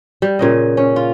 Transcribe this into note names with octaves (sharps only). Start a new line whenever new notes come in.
G3
A#2 C#3 D#5
C#4
F4